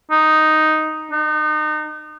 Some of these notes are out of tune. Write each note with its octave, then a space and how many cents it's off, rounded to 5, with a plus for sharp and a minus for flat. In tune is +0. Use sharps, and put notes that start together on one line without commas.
D#4 +0
D#4 -35